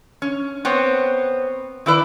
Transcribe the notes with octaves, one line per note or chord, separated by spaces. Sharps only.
C#4
B3 C4 C#5
D#3 E4 B4 D5